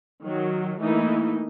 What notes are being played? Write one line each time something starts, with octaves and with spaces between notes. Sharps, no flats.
D#3 F#3
E3 A3 A#3 D#4 E4